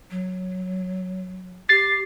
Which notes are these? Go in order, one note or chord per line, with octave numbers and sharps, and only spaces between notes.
F#3
G4 A6 C7